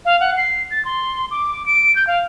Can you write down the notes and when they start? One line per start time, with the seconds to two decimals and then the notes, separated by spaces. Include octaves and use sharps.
0.05 F5
0.20 F#5
0.37 C7
0.71 A6
0.85 C6
1.31 D6
1.66 D7
1.96 G6
2.07 F5